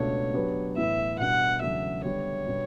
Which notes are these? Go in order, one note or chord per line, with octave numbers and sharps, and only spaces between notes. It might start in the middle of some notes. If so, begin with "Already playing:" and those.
Already playing: C#2 B2 A3 D4 C#5
F#3 B3 D4 G4 B4
A2 E3 B3 E4 E5
B2 G3 D4 F#5
E2 C#3 F#3 A3 D4 E5
D3 G3 B3 C#5
B2 G3 B3 D4 G4